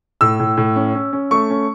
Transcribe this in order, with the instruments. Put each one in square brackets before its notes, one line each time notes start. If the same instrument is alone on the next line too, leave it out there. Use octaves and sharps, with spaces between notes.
[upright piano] A2 E6
A2
A2
C#4
C#4
C#4
A3 C#6
C#4